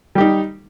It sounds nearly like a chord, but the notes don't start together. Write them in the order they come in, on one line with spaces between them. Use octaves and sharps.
G3 G4 D#4